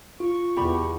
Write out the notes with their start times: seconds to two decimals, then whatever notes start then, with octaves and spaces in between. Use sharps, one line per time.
0.20 F4 C#6
0.56 E2 G4 D5 B5